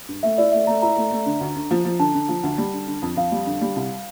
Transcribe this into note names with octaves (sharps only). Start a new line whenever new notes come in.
G2
A3 E5
E4 D5
A3 E5
A3 A#5
E4 A#5
A3
A3
D3
D2
D3
F3
F3
D3 A5
D3
F3
D2
G3
D3
D3
F2
F2 F5
G3
D3
G3
C2